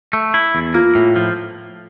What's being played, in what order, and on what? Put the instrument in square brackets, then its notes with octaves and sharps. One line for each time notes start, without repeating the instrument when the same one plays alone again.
[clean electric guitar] A3
E4
E2
[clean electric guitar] A#3 [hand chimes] F4
[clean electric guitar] A2
F3